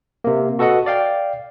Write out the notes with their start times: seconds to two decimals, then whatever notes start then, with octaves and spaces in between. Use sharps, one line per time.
0.24 C3 A#3
0.59 F#4 A4 B4 D#5 F#5
0.86 D5 F5 G5